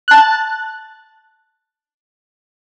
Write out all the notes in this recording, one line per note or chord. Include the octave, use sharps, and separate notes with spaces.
A5 F#6